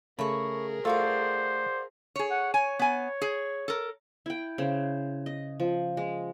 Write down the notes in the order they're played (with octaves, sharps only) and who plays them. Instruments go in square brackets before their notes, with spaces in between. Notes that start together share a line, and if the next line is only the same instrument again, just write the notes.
[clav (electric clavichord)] C#3 A3 [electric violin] G#4 A#4 [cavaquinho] B5 C#6
[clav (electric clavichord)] A3 A4 [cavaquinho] F4 F#4 D5 [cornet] C5
[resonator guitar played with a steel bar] G#4 C#5
[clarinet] F#5
[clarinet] C#5 [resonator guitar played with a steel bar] G#5
[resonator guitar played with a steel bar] B3 G#5
G#4
A4 A#4
[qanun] E4 G5
C#3 C5
D#5
F3
G#3